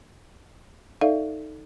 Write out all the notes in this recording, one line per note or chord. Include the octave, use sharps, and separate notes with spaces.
D#4 A4 D5 E5 F5